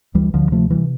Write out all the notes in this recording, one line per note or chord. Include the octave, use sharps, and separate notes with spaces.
D2 E3 G3
D2 D3 F3
C3 F3 A3
C3 E3 G3